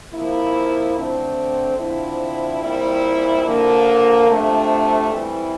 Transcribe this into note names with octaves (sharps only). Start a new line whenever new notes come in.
C3 F3 A#3 E4
D3 A3 C4
D3 F3 C4 E4
A#2 G3 C4 E4
D3 F3 A#3
C3 F3 A3 D4
E3 G3 C4 E4